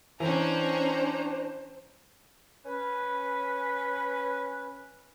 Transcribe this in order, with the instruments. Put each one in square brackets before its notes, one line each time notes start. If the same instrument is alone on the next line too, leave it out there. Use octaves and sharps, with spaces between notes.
[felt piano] E3 [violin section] C#4 G5 A#5 [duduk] D4 [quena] C5
[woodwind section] C#4 B4